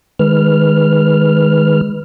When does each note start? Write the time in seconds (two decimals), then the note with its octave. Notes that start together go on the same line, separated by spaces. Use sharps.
0.19 D#3 G#3 B4 F6